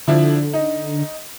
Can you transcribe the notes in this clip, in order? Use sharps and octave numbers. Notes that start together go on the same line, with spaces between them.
D3 F3 D4 E4
D#4